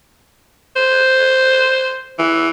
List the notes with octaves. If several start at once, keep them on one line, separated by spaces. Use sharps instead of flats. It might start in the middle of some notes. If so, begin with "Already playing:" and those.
C5
E3